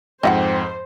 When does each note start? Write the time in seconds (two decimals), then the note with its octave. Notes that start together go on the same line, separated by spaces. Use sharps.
0.23 F2 G#2 C5 D#5 E5 F#5 G5